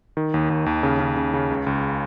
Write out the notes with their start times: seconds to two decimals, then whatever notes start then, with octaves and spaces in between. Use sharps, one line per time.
0.17 D#3
0.34 D#2
0.50 D#2
0.66 D#2
0.83 C#3
1.00 C#3
1.17 C#3
1.34 C#3
1.50 C#2
1.67 C#2